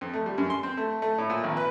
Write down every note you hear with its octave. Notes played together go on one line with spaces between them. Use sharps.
F2
A3
G3
F#2
C6
C4
A3
A3
A2
A#2
G#1
B4